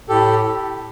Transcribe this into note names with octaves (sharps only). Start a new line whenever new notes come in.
A2 G4 A4